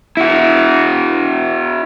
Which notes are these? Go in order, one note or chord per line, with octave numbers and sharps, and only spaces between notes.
E4 F#4